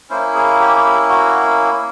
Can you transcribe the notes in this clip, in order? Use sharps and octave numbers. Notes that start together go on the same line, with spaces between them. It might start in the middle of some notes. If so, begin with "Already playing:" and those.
A#3 C#4 E4 C5
G#4
G4
F#4